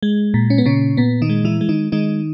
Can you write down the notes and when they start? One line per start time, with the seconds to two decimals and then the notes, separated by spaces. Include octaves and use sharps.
0.03 G#3
0.34 A#2
0.50 C#4
0.58 B3
0.66 A#2 C#3 C#4
0.97 A#2 B3
1.22 D#3 D#4
1.29 G#3
1.45 E3 E4
1.61 G#3
1.69 D#3 D#4
1.92 D#3 G#3 D#4